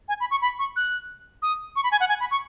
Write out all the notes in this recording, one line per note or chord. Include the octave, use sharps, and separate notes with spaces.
G#5
B5
C#6
B5
C#6
F#6
D#6
C#6
B5
G#5
F#5
G#5
B5
C#6